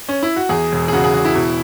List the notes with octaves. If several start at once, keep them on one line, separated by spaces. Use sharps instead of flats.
C#4
E4
F#4
E2 G#4
E1
G#4
C#3 F#4
G#4
E1 F#4
E4
B2